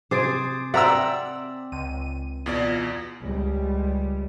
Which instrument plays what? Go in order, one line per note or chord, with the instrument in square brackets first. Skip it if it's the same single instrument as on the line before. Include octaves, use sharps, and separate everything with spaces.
[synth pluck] C3 [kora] G#4 C5 [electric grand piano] D6 A6 D7
[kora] C4 D5 F#5 [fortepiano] E5 A#5 E6
[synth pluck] C#2 D#7
[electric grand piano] E2 B2 D5 [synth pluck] F4 G#6 A#6
[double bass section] C#2 G3